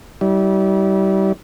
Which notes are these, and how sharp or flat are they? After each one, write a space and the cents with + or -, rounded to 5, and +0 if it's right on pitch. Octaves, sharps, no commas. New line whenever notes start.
G3 -25 E4 -35